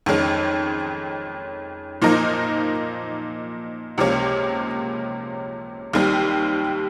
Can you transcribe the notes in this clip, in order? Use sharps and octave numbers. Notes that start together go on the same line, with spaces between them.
F2 D#3 G#3 C#4
A#2 F3 A#3 D#4 A#4
C#2 C3 F3 A#3 C#4
D#2 D#3 G3 C4